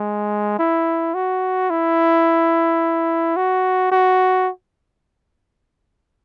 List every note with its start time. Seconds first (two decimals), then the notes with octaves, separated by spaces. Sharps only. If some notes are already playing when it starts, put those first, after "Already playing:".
Already playing: G#3
0.59 E4
1.14 F#4
1.70 E4
3.37 F#4
3.92 F#4